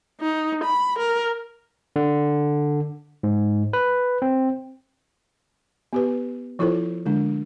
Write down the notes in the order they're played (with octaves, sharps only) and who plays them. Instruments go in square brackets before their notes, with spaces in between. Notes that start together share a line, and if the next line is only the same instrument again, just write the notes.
[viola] D#4
B5
A#4
[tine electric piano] D3
G#2
B4
C4
[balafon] B3 G4 B4
F3 E4 F4 A4 C5
D3 G#3 D4